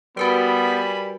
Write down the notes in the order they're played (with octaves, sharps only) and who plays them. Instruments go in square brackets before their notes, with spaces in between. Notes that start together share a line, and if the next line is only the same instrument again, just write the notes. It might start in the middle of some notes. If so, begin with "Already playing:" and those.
[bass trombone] G3 [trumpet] B3 [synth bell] F#4 A#4 B4 [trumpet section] G#5 B5